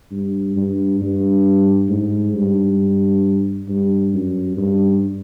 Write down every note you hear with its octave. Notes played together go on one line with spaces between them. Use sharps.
G2
G2
G2
G#2
G2
G2
F#2
G2